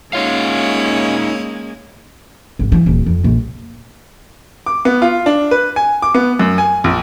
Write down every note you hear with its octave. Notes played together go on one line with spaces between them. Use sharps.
G#3 A#3 C#4 D#4 F4 C#5 F5
G#1
E3
D#1
F2
A#1
D6
B3
F4
D4
B4
G#5
D6
B3
F#2
G#5
A#1